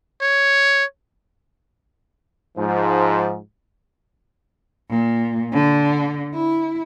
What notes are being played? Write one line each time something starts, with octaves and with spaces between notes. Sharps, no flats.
C#5
G#2 F3
A#2
D3
E4